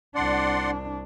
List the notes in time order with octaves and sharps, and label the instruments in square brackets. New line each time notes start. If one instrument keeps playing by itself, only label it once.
[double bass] C2 D4 [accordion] D5 F#5 C6